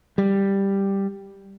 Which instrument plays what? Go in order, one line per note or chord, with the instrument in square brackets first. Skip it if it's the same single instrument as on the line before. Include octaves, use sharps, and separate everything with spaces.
[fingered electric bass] G3